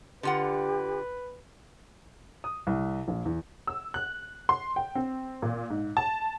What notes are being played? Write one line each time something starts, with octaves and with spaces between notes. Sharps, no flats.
D3 F4 G4 B4 F#5
D#6
C2
A#1
E2
E6
F#6
C6
G5
C4
A#2
G#2
A5